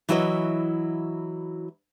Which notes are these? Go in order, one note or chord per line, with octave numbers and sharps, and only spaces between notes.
E3 F#3 E4 F#4 C#5 D#5